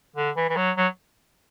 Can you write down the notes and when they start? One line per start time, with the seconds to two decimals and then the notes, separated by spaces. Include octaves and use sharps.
0.16 D3
0.37 E3
0.50 E3
0.57 F#3
0.77 F#3